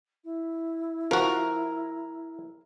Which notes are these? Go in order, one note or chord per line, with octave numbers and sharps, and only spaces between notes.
E4
F3 F#4 A#4